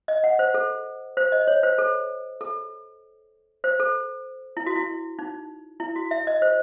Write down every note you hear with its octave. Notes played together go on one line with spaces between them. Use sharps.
D#5
F#5
C5
A4
C5
D#5
C#5
C5
A4
A4
C5
A4
E4
F#4
E4
D#4
E4
F#4
E5
D#5
C5